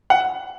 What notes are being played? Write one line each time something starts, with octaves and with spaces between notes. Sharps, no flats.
F#5